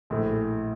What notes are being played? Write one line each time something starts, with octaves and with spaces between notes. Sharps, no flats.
A#1 A2 E3 A3